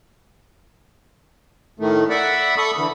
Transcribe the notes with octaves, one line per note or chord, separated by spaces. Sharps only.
A2 D#3 A3
D5 E5 F#5 B5
A4 B5 C#6 D#6
D3 E3 B5